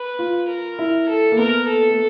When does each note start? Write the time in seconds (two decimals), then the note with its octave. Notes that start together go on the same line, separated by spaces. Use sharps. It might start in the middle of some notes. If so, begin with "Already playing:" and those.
Already playing: B4
0.19 F4
0.49 A#4
0.79 E4
1.08 A4
1.32 A#3
1.38 B3 A#4
1.68 A4
1.90 A3